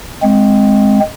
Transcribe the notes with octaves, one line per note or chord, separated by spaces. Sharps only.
G#3 C4